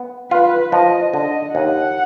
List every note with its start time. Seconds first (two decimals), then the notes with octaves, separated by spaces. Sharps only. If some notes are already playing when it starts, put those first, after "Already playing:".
Already playing: B3
0.31 F4 B4
0.72 F3 D#5
1.13 D3 D#5
1.54 D#2 F#5